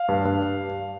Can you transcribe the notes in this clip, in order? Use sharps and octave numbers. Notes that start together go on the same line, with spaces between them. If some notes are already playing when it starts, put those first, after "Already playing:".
Already playing: F5
G2
G2